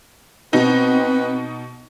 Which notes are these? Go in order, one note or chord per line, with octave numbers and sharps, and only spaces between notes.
B2 B3 C4 D#4 B4